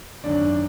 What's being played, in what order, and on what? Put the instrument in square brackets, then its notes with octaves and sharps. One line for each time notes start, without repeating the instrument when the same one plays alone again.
[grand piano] G#1 F#2 D3 D4 D5